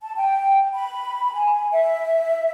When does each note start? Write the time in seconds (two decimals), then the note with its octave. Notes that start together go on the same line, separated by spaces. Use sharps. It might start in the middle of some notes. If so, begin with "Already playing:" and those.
0.01 A5
0.15 G5
0.74 B5
1.33 G#5
1.71 E5